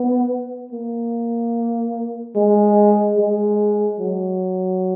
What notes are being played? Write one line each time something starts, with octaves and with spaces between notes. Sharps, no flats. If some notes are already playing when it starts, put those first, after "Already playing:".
Already playing: B3
A#3
G#3
G#3
F#3